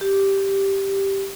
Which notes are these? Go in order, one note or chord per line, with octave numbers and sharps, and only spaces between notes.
G4